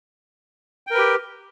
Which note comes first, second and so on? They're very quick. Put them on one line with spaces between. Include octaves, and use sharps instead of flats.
G5 A#4 B4 G4